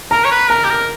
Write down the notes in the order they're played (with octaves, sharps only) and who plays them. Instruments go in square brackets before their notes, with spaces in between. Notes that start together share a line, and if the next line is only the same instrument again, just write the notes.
[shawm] A#4 [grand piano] A#5
[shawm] C#5
B4
[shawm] A#4 [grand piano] A#5
[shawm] G4
A#4